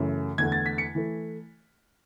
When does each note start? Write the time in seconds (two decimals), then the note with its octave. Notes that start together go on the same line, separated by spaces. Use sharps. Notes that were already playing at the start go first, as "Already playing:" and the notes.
Already playing: F#2 C#3 E3 A3
0.38 E2 D3 A3 G#6
0.52 A6
0.66 B6
0.78 C#7
0.95 E3 A3